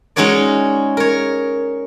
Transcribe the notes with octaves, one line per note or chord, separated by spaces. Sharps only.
G#3 C#4 D#4 F#4 C#5 D5
A#4 C#5